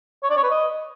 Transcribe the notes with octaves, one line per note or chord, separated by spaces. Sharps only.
C#5
D5
C#5
B4
D#5